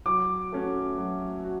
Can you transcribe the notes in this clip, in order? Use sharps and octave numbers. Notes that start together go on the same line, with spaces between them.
F#3 D6
A3 C#4 F#4
F#3
F#4